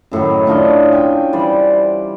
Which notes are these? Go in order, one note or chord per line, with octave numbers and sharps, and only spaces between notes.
F#2 A2 D#3 F#3
C#4 D4 F4 D#5
G5 G#5
E3 G3 C5 D5